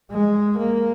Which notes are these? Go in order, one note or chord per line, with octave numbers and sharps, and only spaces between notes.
G#3
A#3